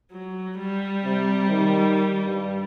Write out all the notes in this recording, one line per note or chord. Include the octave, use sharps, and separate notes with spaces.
F#3
G3
C3
D#3
G2